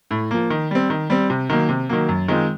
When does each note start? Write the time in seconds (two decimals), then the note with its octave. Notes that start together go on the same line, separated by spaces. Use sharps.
0.11 A2
0.31 F3 A#3
0.50 D#3
0.71 G3 C4
0.90 D#3
1.10 G3 C4
1.30 C3
1.49 D#3 F#3 A#3
1.69 C3
1.89 D#3 F#3 A#3
2.09 F#2
2.28 D#3 G#3 C4 F4